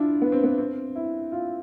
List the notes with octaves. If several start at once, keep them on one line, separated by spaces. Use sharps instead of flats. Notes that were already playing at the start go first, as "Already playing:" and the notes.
Already playing: D4 E4 F4
B3
C4
B3
C4
E4
F4